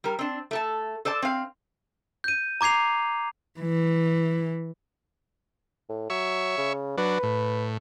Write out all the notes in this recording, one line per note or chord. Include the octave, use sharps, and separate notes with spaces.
G3 A#4
C4 D4
A3 A4 A5
A4 C5 D5 A5
C4 F5
G6 D#7
A#5 D6 G#6 C7 F7
E3
A2
F#3 C#5 E5
C#3
F#3 D4 B4
A2